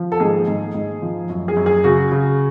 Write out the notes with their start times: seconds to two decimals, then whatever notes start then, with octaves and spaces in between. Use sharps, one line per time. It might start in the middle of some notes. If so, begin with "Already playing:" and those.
Already playing: F3
0.12 A4
0.20 G#2 G#4
0.47 G#2
0.74 G#2
1.02 F3
1.29 F#2
1.48 G#4
1.57 F#2
1.66 G#4
1.84 C#3 F#4
2.12 C#3